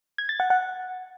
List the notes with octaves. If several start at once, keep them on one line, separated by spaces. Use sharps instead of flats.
G#6
A6
F#5
F#5